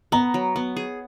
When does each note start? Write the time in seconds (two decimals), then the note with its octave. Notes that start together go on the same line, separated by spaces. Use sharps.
0.12 B3 A#5
0.34 F#3
0.56 B3
0.76 G#4